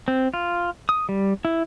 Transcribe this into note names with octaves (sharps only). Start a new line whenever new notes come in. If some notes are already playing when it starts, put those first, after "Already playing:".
C4
F4
D#6
G3
E4